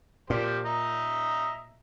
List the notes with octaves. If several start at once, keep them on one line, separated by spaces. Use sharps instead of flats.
A#2 F3 G4 C5
D#5 E5 A#5